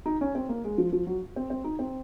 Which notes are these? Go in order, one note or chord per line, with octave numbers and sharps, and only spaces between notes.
D#4
C#4
C4
A#3
G#3
F3
F3
F#3
C4
C4
D#4
C4